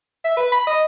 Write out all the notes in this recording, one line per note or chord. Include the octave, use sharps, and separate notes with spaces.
E5
B4
B5
D#5